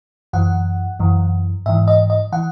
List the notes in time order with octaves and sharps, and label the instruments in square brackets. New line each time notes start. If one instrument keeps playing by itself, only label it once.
[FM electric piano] F#2 E3 F#5
F#2 E3
G#2 E3 E5
D#5
D#5
E3 F#5